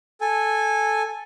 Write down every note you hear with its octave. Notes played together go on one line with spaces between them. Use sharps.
A4 G#5